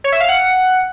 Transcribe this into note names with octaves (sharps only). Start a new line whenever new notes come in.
C#5
E5
F5
F#5